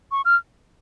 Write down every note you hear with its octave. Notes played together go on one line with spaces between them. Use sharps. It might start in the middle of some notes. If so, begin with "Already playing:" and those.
C#6
F6